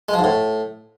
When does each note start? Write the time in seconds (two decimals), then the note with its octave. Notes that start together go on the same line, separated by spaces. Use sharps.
0.09 G#3
0.14 F3
0.19 G#2
0.24 A2